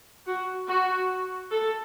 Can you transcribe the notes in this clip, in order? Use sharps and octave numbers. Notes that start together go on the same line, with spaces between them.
F#4
F#4
A4